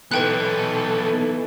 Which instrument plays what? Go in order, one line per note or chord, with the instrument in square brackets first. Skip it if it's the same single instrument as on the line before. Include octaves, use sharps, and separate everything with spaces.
[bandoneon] E3 [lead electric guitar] B3 D#4 [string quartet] A4 [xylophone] B4 G5 F#6